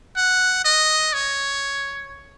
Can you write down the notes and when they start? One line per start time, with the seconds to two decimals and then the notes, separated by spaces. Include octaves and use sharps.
0.16 F#5
0.65 D#5
1.13 C#5